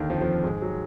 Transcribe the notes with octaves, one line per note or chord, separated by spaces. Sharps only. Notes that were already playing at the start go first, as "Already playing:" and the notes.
Already playing: D#2 D3 D#3
F2 F3
F2 F3
G#2 G#3
F#3